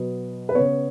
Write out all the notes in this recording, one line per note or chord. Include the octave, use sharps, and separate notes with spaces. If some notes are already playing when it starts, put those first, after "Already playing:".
Already playing: B2 F#3 B3
B4
C#3 B3 C#5